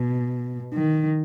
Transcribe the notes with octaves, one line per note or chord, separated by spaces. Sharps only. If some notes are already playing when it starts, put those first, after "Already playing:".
Already playing: B2
D#3